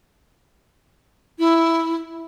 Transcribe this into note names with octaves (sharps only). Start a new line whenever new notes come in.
E4